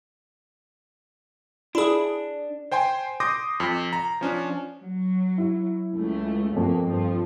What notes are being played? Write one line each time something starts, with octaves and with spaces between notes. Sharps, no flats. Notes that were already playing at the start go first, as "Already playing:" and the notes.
D4 E4 G#4
C5 G5 G#5 C6
C6 D6 D#6 G6 A#6
F2
A#5
F3 C#4 D4
F#3
E4
C#2 A3
F2 B2 A#3
G2 F3